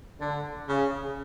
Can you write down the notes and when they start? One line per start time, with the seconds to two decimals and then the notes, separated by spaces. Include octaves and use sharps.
0.20 D3
0.68 C#3